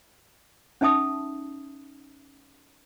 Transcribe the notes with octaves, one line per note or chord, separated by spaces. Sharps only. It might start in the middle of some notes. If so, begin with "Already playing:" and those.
C#4 D#4 E5 A5 D#6